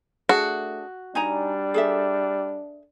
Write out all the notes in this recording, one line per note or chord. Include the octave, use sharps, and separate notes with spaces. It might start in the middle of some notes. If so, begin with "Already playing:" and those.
A3 D4 F#4 G#4 A5
G3 D4 D#4 G#5 A#5
G#4 A4 E5